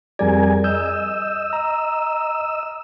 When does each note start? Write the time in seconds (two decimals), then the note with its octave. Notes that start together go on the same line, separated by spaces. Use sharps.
0.19 F2 G3 G#4 A#4 D5 G#5
0.64 D#5 E6 G6
1.53 A#5